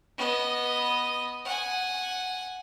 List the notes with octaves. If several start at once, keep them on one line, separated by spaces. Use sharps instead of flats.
B3 D#5
F#5 G#5